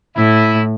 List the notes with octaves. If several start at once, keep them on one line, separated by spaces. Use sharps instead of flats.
A2 E4